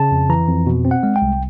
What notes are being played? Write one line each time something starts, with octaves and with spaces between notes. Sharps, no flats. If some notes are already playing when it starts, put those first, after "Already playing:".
Already playing: C#3 A5
F2
E3 A#5
F2
B2
C4
F#5
G#3
G5
C2